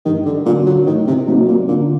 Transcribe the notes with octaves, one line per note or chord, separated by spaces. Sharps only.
G2 D#3
D3
A#2 D3 F#3
F#3
A2 D#3
C3
C3 F#3 A#3 D#4
A#2
A#2 D3